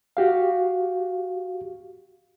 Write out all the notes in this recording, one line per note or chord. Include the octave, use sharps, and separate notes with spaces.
F#4 G4 F5